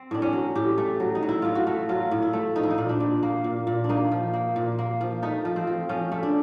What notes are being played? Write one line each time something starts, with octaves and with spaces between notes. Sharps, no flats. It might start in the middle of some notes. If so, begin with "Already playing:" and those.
Already playing: C4
A2 D4
C#4
F#3
A2 G4
A3
F#3
D#4
F#3
E4
A2 F4
F#4
A3
F#3 F4
A2
E4
A3
F3 D#4
E4
D#4
A#2
D4
A#2
A#3
A#2
A#2
D4
A#3 D#4
F3
A#3
A#2
A#3
F3
A3 D#4
F3
C4
F3
F3 C#4
A3
D4